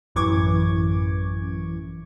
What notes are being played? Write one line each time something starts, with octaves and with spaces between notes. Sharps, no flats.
A1 F#2 E3 C#6 D6 G#6